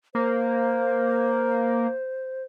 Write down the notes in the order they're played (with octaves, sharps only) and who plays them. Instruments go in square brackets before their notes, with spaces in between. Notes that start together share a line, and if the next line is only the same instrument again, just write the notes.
[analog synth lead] A#3 [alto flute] C5